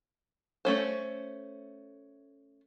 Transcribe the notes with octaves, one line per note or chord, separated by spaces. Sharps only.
A3 C#4 C5